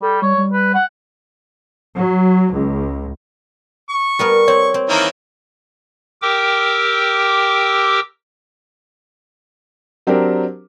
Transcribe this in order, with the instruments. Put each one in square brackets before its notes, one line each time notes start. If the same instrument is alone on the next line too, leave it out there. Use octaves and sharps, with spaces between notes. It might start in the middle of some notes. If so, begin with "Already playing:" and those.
[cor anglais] G3 [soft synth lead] A4
[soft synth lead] G3 [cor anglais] C#5
[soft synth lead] G3
[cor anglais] B4
F#5
[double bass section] F#3
C#2
[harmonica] C#6
[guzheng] G3 B3 A#4
[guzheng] C4 [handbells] C#5
[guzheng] C4
[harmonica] D#3 E3 A#3
[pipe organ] G4 A#4 G5 D6 E6
[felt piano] F#3 C4 D4 G4 A#4